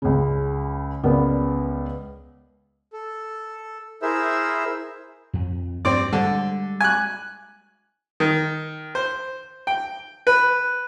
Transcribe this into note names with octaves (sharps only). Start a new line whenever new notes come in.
C#2 C#3
C#2 B3 A#4 D5
A4
E4 G#4 A#4 C5 E5 E6
F2
G2 C4 D5
D3 G3 G#3
G#5 F#6
D#3
C5
G5
B4